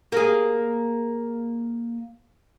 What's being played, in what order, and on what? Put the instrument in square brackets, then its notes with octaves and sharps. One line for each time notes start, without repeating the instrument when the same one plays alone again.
[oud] A#3 G#4